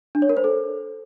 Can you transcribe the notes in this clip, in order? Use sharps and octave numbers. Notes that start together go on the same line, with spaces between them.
D4
C#5
A#4
C5
A4